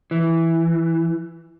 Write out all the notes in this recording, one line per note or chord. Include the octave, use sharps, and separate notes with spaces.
E3